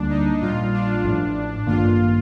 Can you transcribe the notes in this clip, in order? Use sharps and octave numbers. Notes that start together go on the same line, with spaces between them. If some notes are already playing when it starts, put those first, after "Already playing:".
Already playing: D2 D3 G3 A#3 D4
D#4
A#1 A#2 G3 F4
D4
A1 A2 F3
A1 G2 D#3 A#3 F4